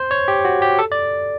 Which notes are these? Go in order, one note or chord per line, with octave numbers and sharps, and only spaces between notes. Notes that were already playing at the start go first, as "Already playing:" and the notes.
Already playing: C5
C#5
G4
F#4
G4
A4
D5